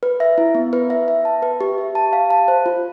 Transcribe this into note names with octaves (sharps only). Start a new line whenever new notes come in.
B4
E5
E4
B3
B4
E5
E5
A5
B4
G4
E5
A5
F5
A5
C5
F4